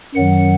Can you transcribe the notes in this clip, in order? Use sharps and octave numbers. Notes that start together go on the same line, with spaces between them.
F#2 D#3 F#3 F#5